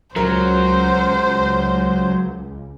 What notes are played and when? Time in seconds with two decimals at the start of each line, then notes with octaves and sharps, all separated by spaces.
0.16 C#2 F#3 A#4 C5